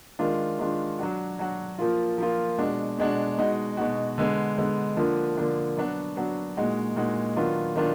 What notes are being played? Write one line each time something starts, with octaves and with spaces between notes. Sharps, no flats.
D#3 G#3 D4 F4
D#3 G#3 D4 F4
F#3 D4 F#4
F#3 D4 F#4
F3 A#3 F4
F3 A#3 F4
B2 G#3 D4 F#4
B2 G#3 D4 F#4
B2 G#3 D#4 F#4
B2 G#3 D#4 F#4
D3 G#3 B3
D3 G#3 B3
D3 F3 A#3 D4
D3 F3 A#3 D4
F#3 B3 D4 F#4
F#3 B3 D4 F#4
A#2 G#3 D#4 F#4
A#2 G#3 D#4 F#4
D#3 F#3 B3 D4 F4
D#3 F#3 B3 D4 F4